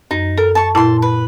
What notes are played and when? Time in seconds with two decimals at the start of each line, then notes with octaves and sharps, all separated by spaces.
0.11 F#2 D#4
0.38 A4 A#4
0.55 A5 C#6
0.75 A#2 E4 A5 C6
1.02 B4